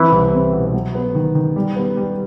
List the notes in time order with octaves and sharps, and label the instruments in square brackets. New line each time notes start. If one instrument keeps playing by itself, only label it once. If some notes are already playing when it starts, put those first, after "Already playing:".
Already playing: [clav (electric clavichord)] E3 E4 [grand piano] C4
[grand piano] C2
C4
B2
F#3
B3
D#3
D#3
G3
B3
G3